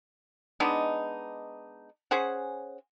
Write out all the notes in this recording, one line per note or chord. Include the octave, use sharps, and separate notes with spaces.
G#3 B3 D4 D#4
C#4 G#4 C5 F#5